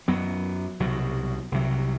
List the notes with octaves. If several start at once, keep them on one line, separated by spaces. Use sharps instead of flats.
F#2 F#3 B3
C2 B2 F#3
C2 C3 F#3